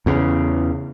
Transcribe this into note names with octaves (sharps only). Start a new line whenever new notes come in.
E2 C#3